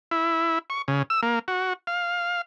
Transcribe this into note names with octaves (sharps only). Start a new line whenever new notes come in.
E4
C#6
C#3
E6
A#3
F#4
F5